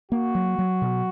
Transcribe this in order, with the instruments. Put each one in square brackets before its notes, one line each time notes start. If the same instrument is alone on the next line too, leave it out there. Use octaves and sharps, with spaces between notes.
[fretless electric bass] A#3 [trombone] F#4
[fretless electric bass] F#3
F#3
B2